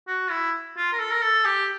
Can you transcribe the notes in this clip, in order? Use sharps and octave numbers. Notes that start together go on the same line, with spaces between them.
F#4
E4
F4
A#4
A4
A#4
A4
G4